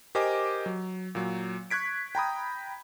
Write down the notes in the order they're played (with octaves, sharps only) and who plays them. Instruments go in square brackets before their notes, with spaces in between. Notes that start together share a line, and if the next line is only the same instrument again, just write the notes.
[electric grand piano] G4 A#4 C5 D#5 G#5 D6
F#3
A#2 F#3
C#6 F#6 G#6 B6 D7
G5 A#5 B5 D#6